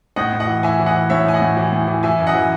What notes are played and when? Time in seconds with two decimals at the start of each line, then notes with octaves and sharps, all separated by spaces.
0.16 A2 D#5 F#5
0.33 A2
0.40 D#5 F#5
0.47 E3
0.63 E3 E5 G#5
0.79 E3
0.86 D#5 F#5
0.95 E3
1.10 A2 C#5 E5
1.25 A2 G#5
1.34 D#5 F#5
1.42 A2
1.57 E3
1.72 A2
1.88 E3
2.03 E3 E5 G#5
2.19 F#2
2.27 D#5 F#5
2.35 E3